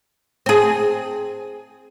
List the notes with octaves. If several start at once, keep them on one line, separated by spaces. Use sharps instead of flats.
C4 G#4